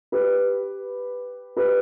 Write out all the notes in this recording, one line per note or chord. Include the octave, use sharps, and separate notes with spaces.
G4 B4
G4 B4